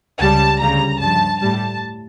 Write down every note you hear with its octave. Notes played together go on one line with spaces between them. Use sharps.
C#2 C#3 G3 A5
D2 C#3 G3 A#5
G2 F3 A5
A2 G3 A5